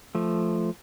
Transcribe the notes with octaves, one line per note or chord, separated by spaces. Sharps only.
F3 A3